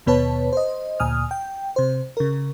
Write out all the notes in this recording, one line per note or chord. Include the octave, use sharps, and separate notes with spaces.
D#2 B2 B3 B4 C#5 A5
C5 D#5
D2 A#2 G#5 D#6 F6
G5
C3 C5
C#3 A#4